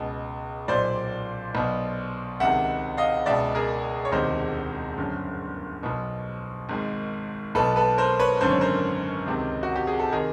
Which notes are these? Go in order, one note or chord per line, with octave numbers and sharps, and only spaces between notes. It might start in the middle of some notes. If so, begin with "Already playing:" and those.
Already playing: C#2 B2
B1 A#2 C5 D5
B1 B2
C#2 C3 D#3 E5 F#5
D#5 F5
C#2 B2 D5 E5
G#4 A#4
C#5
E1 D2 C3 D#3 A#4 C5
G1 F#2 D3
B1 B2
G#1 G#2 D#3
B1 B2 A4 B4
A4 B4
A#4 C5
B4 C#5
G#1 F#2 D3 C5
C#5
A#4 C5
C#2 C3 D#3
F#4
G4
G#4
A4
C3 D#3 G#4 A#4